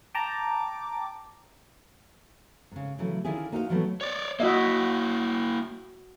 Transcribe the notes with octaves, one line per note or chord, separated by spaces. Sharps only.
G5 A5 A#5 D6
G#2 C#3
C#3 E3 F#3 A3
D3 D#3 C#4 E4 F4 G#4
A#3 D#4 F#4 C5 F5
A2 E3 F#3 A3 B3
C#5 D5
A#3 E4 F#4 D#5 E5